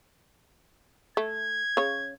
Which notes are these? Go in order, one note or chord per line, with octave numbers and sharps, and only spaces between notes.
A3 G#6
C#3 C#5